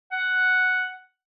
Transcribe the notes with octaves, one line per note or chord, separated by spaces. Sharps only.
F#5